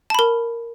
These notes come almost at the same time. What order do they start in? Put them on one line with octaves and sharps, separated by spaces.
A5 B5 A#4